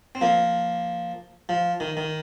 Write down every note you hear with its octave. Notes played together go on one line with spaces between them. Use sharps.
C4
F3 A#3
F3
D#3
D#3